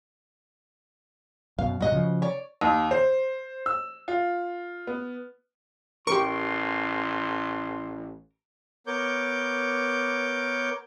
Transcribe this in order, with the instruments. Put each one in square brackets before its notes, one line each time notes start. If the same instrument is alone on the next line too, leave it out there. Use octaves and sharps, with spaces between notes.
[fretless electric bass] F#2 B2 [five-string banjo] F5
[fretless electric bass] F#2 A#2 G3 [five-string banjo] F#4 D#5 F#5
[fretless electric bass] C#3 F3
[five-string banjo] C#5 D5
[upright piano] D#2
C5
E6
F4
B3
[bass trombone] A1 [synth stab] G4 C#6 [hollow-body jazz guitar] A#4 [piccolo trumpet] C6
[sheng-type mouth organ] B3 A#4 C#5 D6 G6